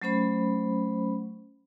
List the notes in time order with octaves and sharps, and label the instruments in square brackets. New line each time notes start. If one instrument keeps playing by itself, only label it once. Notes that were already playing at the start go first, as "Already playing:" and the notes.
[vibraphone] F#3 A3 C#4 C5 B5